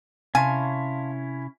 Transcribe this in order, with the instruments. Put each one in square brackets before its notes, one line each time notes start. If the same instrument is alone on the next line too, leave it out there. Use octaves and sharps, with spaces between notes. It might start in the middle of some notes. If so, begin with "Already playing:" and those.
[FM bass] C3 [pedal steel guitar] C#4 E4 C#5 [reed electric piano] F5 A5 C6 [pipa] G#5